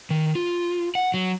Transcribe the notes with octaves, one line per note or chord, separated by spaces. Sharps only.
D#3
F4
F#5
F#3